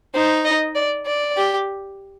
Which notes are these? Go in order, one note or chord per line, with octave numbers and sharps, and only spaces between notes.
D#4 C5
D#5
D5
D5
G4